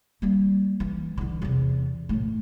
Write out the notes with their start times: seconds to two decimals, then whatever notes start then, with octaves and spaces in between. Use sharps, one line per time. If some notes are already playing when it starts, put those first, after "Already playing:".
0.22 G3 A#3
0.80 E3
1.17 D3 E3
1.42 E2 C3
2.09 A2 A3